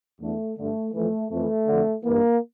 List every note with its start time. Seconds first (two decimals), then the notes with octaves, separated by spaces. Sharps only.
0.21 E2 D3 A3
0.57 G2 D3 A3
0.94 F2 E3 A3
1.31 F2 A3
1.36 E3
1.68 F2 D3
2.04 G2 E3 A#3